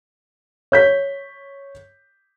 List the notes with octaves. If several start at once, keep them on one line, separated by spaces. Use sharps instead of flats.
C#5 G6 B6